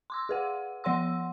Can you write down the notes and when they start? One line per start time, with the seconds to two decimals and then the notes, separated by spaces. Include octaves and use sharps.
0.10 C6 D6 E6
0.29 G#4 B4 F#5
0.84 F3 C#5 F#5 C6 E6